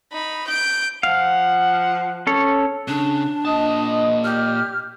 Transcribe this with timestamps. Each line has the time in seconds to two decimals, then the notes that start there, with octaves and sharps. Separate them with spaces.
0.12 D#4 B5
0.48 G6 D7
1.03 F3 F5 F#5
2.27 C#4 A4 C#5
2.88 C#3 D4
3.45 A#2 D#5 A5 D#6
4.24 G4 F6